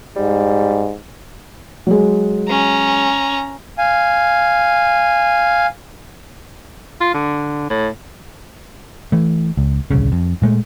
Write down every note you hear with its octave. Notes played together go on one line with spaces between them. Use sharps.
G#2 G3
F#3 G#3
C#4 A#5
F5 G#5
F4
D3
A2
E3 A3
C#2
D#1 C2 C#3
F2
A#2 G#3 A3